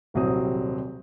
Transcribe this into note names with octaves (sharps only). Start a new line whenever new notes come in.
D#1 C2 F#3 G3 C4 D#6